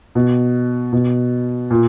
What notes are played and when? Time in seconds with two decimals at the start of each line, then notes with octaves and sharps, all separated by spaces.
0.15 B2
0.92 B2
1.70 A#2